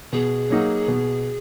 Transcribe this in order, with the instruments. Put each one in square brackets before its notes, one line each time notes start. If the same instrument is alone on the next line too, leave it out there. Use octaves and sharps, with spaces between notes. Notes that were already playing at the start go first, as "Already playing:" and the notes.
[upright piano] B2 [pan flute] G#4
[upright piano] F#3 A#3 D#4 F#4
B2